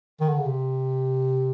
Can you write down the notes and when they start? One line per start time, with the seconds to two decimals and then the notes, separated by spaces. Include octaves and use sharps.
0.21 D#3
0.29 D3
0.38 C#3
0.46 C3